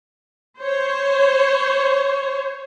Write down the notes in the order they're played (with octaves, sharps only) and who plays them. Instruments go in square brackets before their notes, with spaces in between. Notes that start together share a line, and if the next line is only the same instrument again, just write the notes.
[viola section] C5 C#5